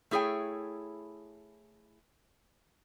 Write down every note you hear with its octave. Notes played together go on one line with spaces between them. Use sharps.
A3 E4 G#4 C#5 G5